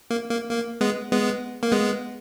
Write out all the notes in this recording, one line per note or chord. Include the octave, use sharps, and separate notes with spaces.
A#3
A#3
A#3
G#3 B3
G#3 B3
A#3
G#3 B3